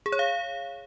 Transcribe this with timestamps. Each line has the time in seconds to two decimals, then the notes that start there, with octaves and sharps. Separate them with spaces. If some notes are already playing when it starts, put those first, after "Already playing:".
0.06 G#4
0.12 C#5
0.19 F5